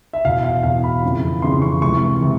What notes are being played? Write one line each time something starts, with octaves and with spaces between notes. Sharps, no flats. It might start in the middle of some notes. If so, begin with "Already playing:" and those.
E5
E2 B2 F5
F5
E2 B2 F5
B5
F2 C#3 E3
F2 C#3 E3 C6
C#6
C#2 C3 E3 C#6
C3 E3